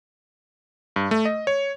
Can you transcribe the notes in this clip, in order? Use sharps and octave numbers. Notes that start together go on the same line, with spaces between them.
G2
A3
D#5
C#5